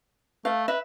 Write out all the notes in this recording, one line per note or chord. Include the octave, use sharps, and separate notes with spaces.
A3 F5
B4 E5